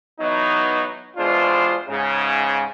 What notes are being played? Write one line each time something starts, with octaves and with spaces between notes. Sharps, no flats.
E3 F#3 B3 D#4
E2 B2 G#3 D4 F4 C5
G#2 C#3